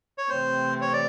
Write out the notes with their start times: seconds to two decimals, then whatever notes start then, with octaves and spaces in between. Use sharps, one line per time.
0.18 C#5
0.29 C3 E3 A3 C4 C5
0.82 C#5
0.93 D5